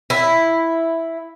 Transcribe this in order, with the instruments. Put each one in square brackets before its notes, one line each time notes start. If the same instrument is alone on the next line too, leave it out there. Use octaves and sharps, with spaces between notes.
[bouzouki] E4